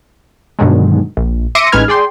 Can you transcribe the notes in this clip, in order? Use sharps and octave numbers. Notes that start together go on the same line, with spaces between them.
G2 B2 D3 D#3 F#3 G#3
A#1
E5 C6 D6 A#6 C#7 D#7
A1 G#3 D#4 B4 F6 G#6
G#4 D5 G5 C6